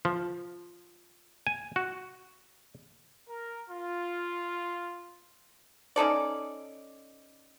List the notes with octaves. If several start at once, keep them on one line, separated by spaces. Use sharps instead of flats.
F3
G#5
F#4
A#4
F4
C#4 D#4 A4 D5